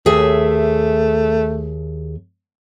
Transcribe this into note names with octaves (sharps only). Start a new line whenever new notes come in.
D#2 A3 G#4 E5